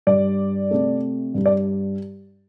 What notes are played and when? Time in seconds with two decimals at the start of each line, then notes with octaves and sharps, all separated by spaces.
0.07 G2 G3 D5
0.71 C3 A3
1.34 G2 G3
1.46 D5